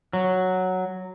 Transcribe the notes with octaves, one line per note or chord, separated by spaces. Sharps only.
F#3